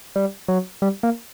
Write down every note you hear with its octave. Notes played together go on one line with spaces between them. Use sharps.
G3
F#3
G3
A#3